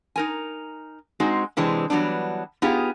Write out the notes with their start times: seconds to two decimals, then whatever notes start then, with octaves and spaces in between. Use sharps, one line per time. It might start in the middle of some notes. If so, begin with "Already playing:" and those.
0.16 D#4 A#4 G#5
1.20 G#3 C4 D#4 F#4 G#4
1.57 C3 E3 G#3 C4 D4
1.90 E3 F#3 G3 B3 D4
2.62 B3 D#4 F4 G4 G#4